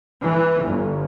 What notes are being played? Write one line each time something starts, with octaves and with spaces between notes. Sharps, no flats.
E3
G1